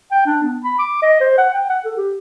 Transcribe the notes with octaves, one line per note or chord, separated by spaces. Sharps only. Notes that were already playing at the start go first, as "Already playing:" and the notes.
G5
D4
B3
B5
D6
D#5
C5
F#5
G5
F#5
A4
G4